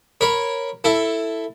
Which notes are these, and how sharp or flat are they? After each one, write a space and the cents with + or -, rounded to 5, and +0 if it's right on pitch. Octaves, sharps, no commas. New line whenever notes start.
A#4 +0 C#5 -10 B5 +0
E4 +0 A4 +10